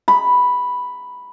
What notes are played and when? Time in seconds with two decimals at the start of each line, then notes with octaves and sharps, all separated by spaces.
0.08 B5